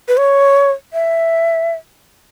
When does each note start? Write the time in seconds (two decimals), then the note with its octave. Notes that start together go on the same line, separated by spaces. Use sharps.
0.08 B4
0.17 C#5
0.93 E5